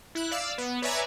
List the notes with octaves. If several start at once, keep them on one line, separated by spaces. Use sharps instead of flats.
E4 F#6
D5 F5 E6
B3
B4 C#5 D5 E5 G#5 A#5